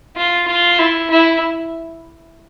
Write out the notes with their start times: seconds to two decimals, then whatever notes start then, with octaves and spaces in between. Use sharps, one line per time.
0.16 F4
0.47 F4
0.79 E4
1.10 E4